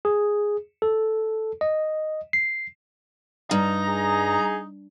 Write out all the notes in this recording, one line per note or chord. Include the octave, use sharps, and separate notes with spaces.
G#4
A4
D#5
C7
G2 D#4 A#5
G#4